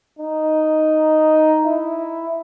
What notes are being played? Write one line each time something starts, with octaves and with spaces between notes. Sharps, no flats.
D#4
E4